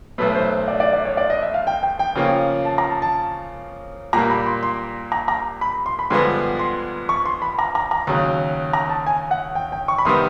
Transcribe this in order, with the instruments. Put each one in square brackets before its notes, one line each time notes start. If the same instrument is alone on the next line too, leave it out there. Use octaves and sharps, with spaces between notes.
[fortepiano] B1 B2 F#3 A3 [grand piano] B4
[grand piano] B4
C5
D5
D5
D5
C#5
D5
D#5
E5
F5
G5
G5
G5
[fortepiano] C#3 F3 A#3 C#4
[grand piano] A5
A#5
A5
A5
[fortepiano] A#2 G3 A#3 [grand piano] A#5
[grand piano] B5
C6
C6
A#5
A#5
B5
C6
B5
[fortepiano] G2 D3 F3 G#3 B3 [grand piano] C6
[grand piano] C6
C#6
C6
B5
A#5
A#5
A#5
[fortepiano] D#2 C#3 F#3
[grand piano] A#5
A5
G#5
F#5
G5
G5
C#6
B5
[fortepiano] C3 D#3 G3 B3 [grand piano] C6